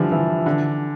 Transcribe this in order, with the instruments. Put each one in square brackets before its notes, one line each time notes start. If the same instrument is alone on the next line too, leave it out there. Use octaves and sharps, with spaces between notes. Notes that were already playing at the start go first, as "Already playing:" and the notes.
Already playing: [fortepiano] D3 E3 F3 G3
E3
D3